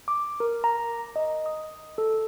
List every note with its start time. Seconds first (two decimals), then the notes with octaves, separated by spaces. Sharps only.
0.08 D6
0.40 A#4
0.64 A#5
1.16 D#5
1.46 D#6
1.98 A4